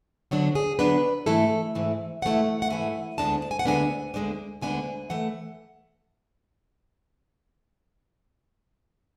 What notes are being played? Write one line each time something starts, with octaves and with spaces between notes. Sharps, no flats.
D3 F#3 B3 D4 F#4
G#4
D3 F#3 B3 D4 B4
G#2 E3 A3 E4 A4
G#2 E3 A3 E4
G#2 E3 A3 E4 F#5
F#5
G#2 E3 A3 E4 G#5
D2 D3 G#3 B3 D4 A5
A5
G#5
F#5
D2 D3 G#3 B3 D4 G#5
D2 D3 G#3 B3 D4
D2 D3 G#3 B3 D4 G#5
E3 A3 F#5